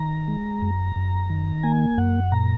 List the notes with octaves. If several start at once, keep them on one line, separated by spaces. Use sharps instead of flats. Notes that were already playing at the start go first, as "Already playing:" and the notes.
Already playing: D#3 A#5
G#3
F#2
F#2
D#3
A#3 G#5
F#2 F#5
A#2 A#5